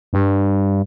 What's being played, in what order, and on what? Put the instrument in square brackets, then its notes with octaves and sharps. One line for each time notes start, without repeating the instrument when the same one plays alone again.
[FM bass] G2